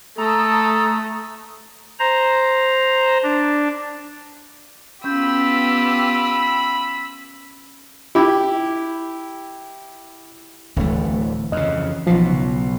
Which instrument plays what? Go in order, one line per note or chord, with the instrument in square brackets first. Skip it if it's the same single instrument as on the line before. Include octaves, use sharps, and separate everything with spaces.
[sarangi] A3 [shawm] A4 [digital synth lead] A#5 [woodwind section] D#6
[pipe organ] C5 A#5
D4
[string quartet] B3 F4 G4 [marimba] C#4 G6 [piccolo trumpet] B5 [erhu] E6
[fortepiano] E4 G4
[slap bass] D1 A3 [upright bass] D2 E3
[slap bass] F2 C#3 [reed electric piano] D#5
[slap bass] B1 B2 [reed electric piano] F3
[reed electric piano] C#3